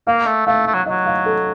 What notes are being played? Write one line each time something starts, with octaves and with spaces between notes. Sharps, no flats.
A#3 F5
A3
A3 F5
A3
F#3
D#5
F#3
F5
A4